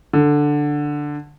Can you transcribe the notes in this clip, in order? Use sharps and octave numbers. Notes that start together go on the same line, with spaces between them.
D3